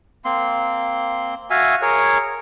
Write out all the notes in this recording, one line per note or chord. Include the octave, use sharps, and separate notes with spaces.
A#3 C4 C6
F#4 E5 F5 G#5
G#4 A#4 C#5